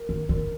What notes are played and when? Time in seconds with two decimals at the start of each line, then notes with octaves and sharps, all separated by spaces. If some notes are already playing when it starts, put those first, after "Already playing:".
Already playing: A#4
0.09 D#3
0.29 D3 A#4